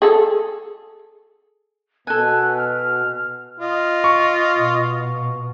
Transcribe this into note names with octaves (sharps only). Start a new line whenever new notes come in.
G#4 A4
B2 A4 G#5 F#6
F6
F4 D#5
C#6
B2